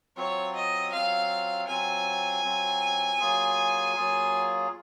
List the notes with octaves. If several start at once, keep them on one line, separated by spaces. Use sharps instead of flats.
F#3 C4 F4 C#5
D#5
F#3 C4 F4 F5
F#3 C4 F4 G#5
F#3 C4 F4
F#3 A#3 F4 G#4
F#3 A#3 F4 G#4